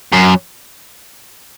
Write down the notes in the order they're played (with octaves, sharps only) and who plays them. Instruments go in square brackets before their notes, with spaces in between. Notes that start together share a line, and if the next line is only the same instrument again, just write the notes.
[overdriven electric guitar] F#2